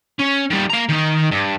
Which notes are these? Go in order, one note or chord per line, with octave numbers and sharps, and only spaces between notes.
C#4
D#3 G3
A#3 A#5
D#3 D#4
G2